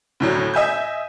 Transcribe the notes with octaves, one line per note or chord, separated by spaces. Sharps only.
D2 A2 F#3
D#5 E5 G#5 G6